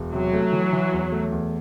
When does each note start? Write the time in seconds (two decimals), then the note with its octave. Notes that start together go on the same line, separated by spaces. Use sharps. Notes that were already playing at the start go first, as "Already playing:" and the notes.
Already playing: E1
0.13 C3 F#3
0.33 A3
0.52 E3
0.72 E3
0.93 E2
1.12 A3
1.32 E2